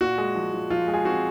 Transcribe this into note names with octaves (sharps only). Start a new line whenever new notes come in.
A#2 F#4
G#3
F3
F3
F3 F4
G#3
G#4
C4 F#4